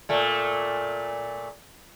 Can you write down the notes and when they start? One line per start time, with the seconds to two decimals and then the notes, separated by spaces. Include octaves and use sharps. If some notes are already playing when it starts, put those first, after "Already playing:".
0.09 A#2 A3